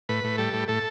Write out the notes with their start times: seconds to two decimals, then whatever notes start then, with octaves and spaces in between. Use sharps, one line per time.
0.09 A2 B4
0.24 A2
0.38 G3 A4
0.53 A2
0.68 A2 A4